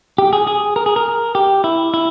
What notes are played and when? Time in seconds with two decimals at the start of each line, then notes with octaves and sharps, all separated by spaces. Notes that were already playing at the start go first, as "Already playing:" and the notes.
0.18 G4
0.33 G#4
0.47 G#4
0.76 A#4
0.86 G#4
0.96 A#4
1.35 G4
1.64 E4
1.94 E4